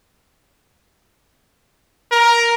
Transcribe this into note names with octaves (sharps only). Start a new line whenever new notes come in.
A#4